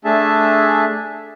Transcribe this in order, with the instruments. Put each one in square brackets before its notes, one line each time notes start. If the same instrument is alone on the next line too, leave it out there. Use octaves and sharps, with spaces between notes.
[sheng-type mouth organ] A3 D4 G#4 E5 A5